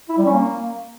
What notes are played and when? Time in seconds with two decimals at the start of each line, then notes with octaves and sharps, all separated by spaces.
0.09 E4
0.17 G3
0.26 C#4
0.34 A#3